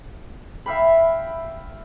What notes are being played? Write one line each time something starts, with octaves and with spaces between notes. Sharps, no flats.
E5 F5 G5 B5